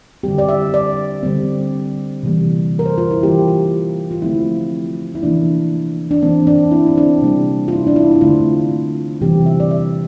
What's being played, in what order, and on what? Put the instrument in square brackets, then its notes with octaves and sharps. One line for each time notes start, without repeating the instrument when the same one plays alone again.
[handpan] D3 G3 C4 G4
D5
E5
D5
D3 G3 C4
C3 E3 G3 A#3
A#4
C5
F4
E4
E3 G3 A#3 G4
F4
F4
D3 F3 A3 C4 E4
E4
C3 E3 A#3 D4
D4
E3 A#3 C4
D4
E4
C4
D4
C3 G3 A#3
F4
E4
D4
E4
E4
D3 A3 C4 F4
C3 E3 G3 C4 G4
E5
D5
E5